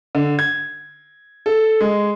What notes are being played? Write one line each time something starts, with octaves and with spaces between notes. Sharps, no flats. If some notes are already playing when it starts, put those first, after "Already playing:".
D3
G#6
A4
G#3